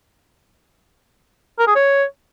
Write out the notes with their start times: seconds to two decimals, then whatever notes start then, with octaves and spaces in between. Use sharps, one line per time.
1.59 A#4
1.67 G#4
1.76 C#5